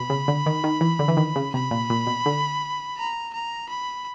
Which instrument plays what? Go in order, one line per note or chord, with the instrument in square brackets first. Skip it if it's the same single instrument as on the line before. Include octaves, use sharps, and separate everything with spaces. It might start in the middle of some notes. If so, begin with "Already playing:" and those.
Already playing: [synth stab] B2 [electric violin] B5
[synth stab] C#3
D3
D#3
D#3
E3
D3
E3
D#3
C#3
[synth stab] C3 [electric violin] B5
[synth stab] A#2
A#2
B2
D3
[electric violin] A#5
A#5
B5